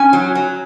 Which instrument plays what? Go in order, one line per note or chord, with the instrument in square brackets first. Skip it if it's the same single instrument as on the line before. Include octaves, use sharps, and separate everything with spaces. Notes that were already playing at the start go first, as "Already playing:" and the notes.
Already playing: [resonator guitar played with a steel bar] C#4 G#5
F#3
F#3